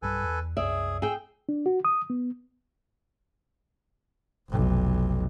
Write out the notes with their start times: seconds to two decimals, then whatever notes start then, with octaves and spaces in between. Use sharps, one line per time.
0.02 B1 G2 G3 A4 B4 G#5
0.24 E2
0.57 C2 F#2 G#4 D5 E5
1.02 G#4 G5 E6
1.49 D4
1.66 F#4
1.85 D#6
2.10 B3
4.50 F1 B1